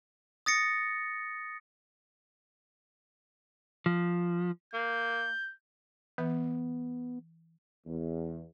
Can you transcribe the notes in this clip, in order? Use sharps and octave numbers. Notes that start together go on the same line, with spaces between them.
D#6 A6 A#6 C#7
F3
A#3 G6
E3 B3
E2